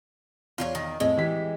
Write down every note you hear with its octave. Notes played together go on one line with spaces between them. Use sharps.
E2 F4 G4 C#5
D#3
F2 A2 G#3
E3 G4 B6